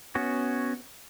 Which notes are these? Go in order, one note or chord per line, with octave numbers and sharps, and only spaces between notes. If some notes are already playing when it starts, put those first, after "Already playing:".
B3 C#4 F#4